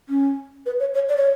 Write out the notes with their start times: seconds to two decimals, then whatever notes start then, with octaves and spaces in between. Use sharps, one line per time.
0.09 C#4
0.66 B4
0.80 C#5
0.94 C#5
1.09 D5
1.17 C#5